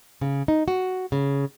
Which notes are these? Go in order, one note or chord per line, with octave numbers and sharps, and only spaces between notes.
C#3
D#4
F#4
C#3